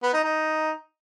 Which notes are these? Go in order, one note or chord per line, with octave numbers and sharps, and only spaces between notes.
B3
D#4
D#4